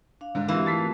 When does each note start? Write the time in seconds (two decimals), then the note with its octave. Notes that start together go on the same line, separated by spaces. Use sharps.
0.21 D4 F5
0.35 G#2 D3
0.48 E3 A#3 C4 F#4 G4
0.66 A3 F4 A5 A6 B6 C7